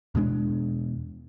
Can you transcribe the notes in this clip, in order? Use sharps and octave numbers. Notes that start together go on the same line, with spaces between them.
E2 B2 G#3 D4